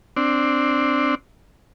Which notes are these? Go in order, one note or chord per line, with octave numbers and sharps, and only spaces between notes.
C4 D4